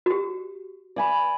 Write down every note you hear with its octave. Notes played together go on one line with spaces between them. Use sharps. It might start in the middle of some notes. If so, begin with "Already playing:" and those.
F#4 G4
D5 G#5 B5